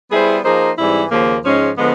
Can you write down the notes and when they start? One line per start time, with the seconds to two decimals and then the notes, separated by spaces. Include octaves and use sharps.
0.11 G3 B3 E4 G#4 C5
0.44 F3 A#3 D#4 G#4 C5
0.78 G#2 E3 G3 C4 E4
1.11 D#2 C#3 F3 A#3
1.44 G#2 F3 G#3 C#4
1.77 D3 F3 G#3 B3